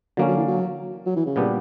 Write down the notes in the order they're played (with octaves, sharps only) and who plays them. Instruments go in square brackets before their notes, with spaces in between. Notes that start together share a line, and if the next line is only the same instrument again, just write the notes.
[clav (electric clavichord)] D3 A#3 C#4 [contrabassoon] F#3
[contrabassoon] F#3
E3
F#3
F#3
E3
C#3
[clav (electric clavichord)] A#2 G3 B3 D4 G4